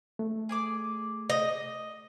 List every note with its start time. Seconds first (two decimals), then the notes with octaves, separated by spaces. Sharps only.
0.19 A3
0.49 G#4 D5 D6
1.30 D#5